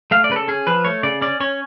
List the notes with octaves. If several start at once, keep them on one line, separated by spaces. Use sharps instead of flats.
A3 F5
D5
C#3 B4
A4
C#4 G#4
F3 B4
A3 C#5
C#3 D5
C#4 D5
C#4 C#5